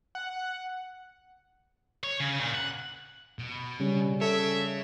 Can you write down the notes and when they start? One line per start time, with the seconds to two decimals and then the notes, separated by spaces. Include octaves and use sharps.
0.15 F#5
2.03 C#5
2.20 C#3
2.40 A#2
2.55 F#5
3.39 B2
3.80 C#3 G3 C#4
4.21 G#4 A4 C#5 E5